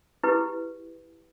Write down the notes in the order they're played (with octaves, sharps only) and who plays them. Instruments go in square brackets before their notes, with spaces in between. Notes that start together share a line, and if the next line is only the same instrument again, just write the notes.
[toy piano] E4 G4 G#4 B4